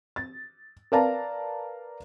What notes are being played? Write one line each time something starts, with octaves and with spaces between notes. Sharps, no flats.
A6
A#4 B4 D5 F5 A5 A#5